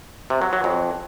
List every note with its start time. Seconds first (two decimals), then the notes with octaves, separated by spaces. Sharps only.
0.30 C3
0.42 F#3
0.53 F#3
0.64 F2